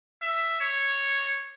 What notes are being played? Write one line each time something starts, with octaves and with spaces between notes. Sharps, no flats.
E5
C#5